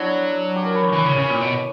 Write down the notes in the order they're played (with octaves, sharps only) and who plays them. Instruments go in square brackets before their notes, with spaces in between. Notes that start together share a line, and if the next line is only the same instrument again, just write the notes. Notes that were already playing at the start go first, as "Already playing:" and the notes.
Already playing: [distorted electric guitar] F#3 [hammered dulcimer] B3 D4 E4 F#4
[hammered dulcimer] G4
A#4
B4
C#5
[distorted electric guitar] E3 [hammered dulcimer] B4
[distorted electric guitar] C#3
C#3
A#2
B2